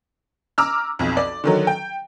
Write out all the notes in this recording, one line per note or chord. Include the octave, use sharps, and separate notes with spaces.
A#5 D6 E6 F6
B1 F2
D5
D3 D#3 F#3
G5